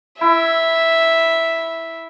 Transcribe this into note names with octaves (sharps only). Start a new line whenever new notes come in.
E4 E5